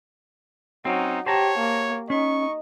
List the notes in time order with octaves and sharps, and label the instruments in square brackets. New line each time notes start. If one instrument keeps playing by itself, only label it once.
[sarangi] F#3 [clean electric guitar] C4 C#4 [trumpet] D#4
[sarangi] G4 [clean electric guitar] C5 A5 A#5 [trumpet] C#5
[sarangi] A#3
[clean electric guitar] C#4 [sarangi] D#4 [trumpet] C#6